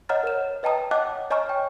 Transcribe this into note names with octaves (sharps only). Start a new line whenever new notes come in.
C#5 D#5 F#5 A#5 F6 A6
A#4 C5 E7
B4 D#5 G5 A5 A#5 D#6
C#5 D#5 F#5 A5 D6 F#6
C#5 D#5 G#5 A#5 C#6 F6
G5